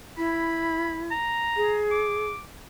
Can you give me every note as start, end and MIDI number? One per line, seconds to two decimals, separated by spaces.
0.17 1.11 64
0.17 1.02 83
1.11 1.78 82
1.57 2.27 68
1.91 2.41 86